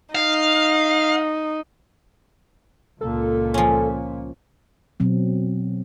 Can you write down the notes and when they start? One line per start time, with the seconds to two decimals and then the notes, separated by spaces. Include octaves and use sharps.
0.15 D#4 F5
3.01 C#2 A#2 A4
3.54 F3 C#4
5.00 B2 F#3 C4